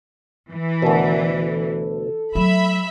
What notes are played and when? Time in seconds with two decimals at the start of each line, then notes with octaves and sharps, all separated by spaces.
0.51 E3
0.82 D2 B2 A#4
1.39 A4
2.35 F#3 A3 E5 B5